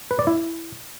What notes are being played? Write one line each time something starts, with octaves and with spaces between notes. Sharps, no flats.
B4
D5
E4